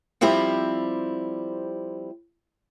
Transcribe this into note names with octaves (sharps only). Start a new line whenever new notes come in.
F3 G3 C4 E4 G4